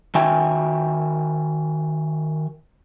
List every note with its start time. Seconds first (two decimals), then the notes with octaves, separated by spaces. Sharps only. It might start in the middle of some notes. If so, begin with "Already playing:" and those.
0.15 D#3 F#4 E5 G5 G#5